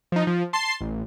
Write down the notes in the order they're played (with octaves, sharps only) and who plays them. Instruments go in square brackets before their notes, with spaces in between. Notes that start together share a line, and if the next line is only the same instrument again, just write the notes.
[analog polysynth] F3 D#4
F3
A5 C6 C7
A1